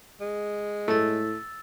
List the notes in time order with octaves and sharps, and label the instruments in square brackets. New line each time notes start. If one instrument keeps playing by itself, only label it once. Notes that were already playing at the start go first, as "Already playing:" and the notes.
[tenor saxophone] G#3
[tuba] A2 [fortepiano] A3 [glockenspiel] E6 A6